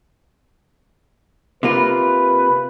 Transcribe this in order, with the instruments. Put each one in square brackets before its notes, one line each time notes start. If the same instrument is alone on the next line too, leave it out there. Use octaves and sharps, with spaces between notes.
[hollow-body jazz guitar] C3 A#3 F4 [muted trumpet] B4